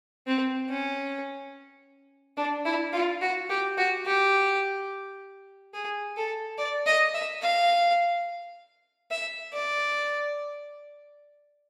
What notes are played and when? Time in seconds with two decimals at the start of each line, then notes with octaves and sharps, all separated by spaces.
0.27 C4
0.69 C#4
2.37 D4
2.65 E4
2.93 F4
3.22 F#4
3.50 G4
3.78 F#4
4.06 G4
5.74 G#4
6.17 A4
6.58 D5
6.86 D#5
7.14 E5
7.42 F5
9.11 E5
9.53 D5